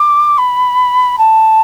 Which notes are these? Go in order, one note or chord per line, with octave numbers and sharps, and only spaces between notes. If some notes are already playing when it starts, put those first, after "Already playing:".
Already playing: D6
B5
A5